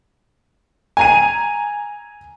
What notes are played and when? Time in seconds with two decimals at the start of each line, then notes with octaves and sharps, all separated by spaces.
0.97 G#5 A#5 D#7